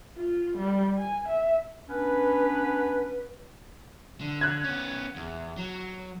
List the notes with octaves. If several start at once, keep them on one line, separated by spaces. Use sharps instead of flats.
F4
G3
G#5
E5
B3 C#4 D4 B4
D3
F#6 G#6
B3 C#4
E2
F#3